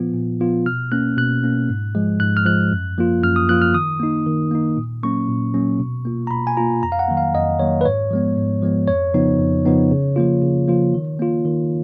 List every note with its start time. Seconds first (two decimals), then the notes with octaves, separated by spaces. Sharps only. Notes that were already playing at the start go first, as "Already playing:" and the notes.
Already playing: A#2 F3 B3 F4
0.14 A#2
0.40 F3 B3 F4
0.66 B2 F6
0.92 A#3 C#4 F#6
1.17 B2 F#6
1.44 A#3 C#4
1.69 G#2
1.95 F3 G#3
2.20 G#2 F#6
2.37 F6
2.45 F3 G#3 F#6
2.72 F#2
2.98 F3 A#3 F4
3.23 F#2 F6
3.36 D#6
3.49 F3 A#3 F4 F#6
3.62 F6
3.74 D#3 D#6
4.00 A#3 D#4
4.26 D#3
4.51 A#3 D#4
4.77 A#2
5.03 F#3 A#3 C#4 C#6
5.29 A#2
5.54 F#3 A#3 C#4
5.80 B2
6.05 A#3 F4
6.27 A#5
6.31 B2 B5
6.47 G#5
6.57 A#3 F4 A#5
6.83 F2 A#5
6.92 F5
6.99 F#5
7.08 D#3 F#3 A#3
7.17 F5
7.34 F2 D#5
7.59 D#3 F#3 A#3 C#5
7.81 B4
7.85 G#2 C#5
8.11 F3 G#3 B3
8.37 G#2
8.62 F3 G#3 B3
8.88 F2 C#5
9.14 C#3 F3 B3 D#4
9.39 F2
9.65 C#3 F3 B3 D#4
9.91 C#3
10.16 F3 A#3 F4
10.42 C#3
10.68 F3 A#3 F4
10.94 D#3
11.19 A#3 F4
11.45 D#3